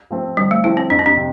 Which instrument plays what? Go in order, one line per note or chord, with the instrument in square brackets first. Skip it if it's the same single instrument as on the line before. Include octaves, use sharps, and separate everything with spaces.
[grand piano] F3 A3 C4
[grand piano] D3 [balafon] G3
[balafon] A3
[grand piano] F3 A3 C4 [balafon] E4
[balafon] C4
[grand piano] F2 [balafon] D4
[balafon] C4
D4
[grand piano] C3